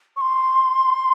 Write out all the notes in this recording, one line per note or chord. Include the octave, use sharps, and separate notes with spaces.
C#6
C6